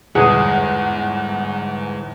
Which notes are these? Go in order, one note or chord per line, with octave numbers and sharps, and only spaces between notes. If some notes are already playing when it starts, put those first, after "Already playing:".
G1 E2 G#2 G#3 G#4 F#5